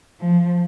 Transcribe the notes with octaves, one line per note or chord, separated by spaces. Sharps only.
F3